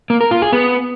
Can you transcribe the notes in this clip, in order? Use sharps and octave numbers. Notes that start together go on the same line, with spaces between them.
A#3
A#4
F4
G#4
B3